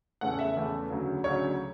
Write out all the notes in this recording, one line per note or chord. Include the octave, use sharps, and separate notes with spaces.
E2 C#3 E3 A3 F#5
E5
E2 C#3 E3 A3
D2 C#3 F#3
D2 C#3 F#3 C#5